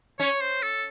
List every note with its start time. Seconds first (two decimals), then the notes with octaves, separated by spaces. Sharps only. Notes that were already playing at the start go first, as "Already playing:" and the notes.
0.19 C#4 C#5
0.41 C5
0.62 A4